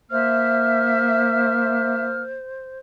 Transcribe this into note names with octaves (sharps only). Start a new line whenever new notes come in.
A#3 C5 E5 F6